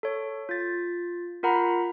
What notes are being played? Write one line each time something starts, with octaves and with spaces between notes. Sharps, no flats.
A4 C#5
F4 A6
F4 A#4 F#5 A#5 B5